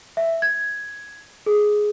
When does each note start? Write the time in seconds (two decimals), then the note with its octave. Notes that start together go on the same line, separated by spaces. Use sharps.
0.17 E5
0.42 G#6
1.46 G#4